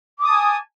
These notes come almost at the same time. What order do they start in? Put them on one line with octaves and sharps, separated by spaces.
D6 D#6 A5 G#5